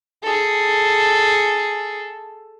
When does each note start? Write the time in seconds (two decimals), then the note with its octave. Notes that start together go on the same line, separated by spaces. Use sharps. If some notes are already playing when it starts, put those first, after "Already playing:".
0.23 G#4 A4